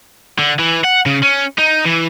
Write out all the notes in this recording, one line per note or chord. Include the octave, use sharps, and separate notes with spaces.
D3
E3
F#5
C#3
C#4
D#4
E3